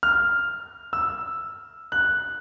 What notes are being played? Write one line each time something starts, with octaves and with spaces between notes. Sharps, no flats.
F6
E6
F#6